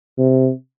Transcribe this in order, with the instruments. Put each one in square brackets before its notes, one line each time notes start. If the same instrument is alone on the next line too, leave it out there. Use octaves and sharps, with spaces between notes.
[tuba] C3